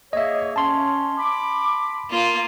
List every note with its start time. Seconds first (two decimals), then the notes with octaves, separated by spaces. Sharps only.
0.13 A#3 G#4 C#5 D#5 E5
0.56 C#4 A5 C6
1.18 B5 D6
2.10 A#3 F4